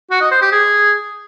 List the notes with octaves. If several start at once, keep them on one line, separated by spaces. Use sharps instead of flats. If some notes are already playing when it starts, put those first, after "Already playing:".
F#4
D#5
C5
G4
G#4